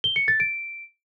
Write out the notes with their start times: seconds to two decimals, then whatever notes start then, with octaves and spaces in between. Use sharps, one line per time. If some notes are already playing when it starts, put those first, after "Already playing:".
0.04 G7
0.16 C#7
0.28 A6
0.40 D7